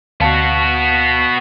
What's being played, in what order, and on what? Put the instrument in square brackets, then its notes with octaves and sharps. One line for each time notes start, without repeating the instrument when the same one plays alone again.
[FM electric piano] D2 F5 A5 [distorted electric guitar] B3 F#4